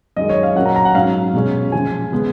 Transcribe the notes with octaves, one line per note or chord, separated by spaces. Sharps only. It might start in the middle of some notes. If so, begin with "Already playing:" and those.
F#2 D#3 G#3 D#5
C#5
F5
A#2 F#3 A#3 C#4 F#5
A#5
A#5
F#5
G#2 F#3 C#4 F5
B2 G#3 C#4
A#2 F3 G#3 G#5
C#3 G#3 B3